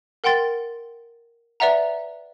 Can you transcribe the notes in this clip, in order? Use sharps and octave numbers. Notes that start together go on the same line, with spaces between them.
A#4 F#5 G5 C6 A6
B4 D5 E5 F#5 A#5